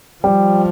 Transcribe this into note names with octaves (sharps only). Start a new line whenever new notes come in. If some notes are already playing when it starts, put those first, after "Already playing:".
F3 G3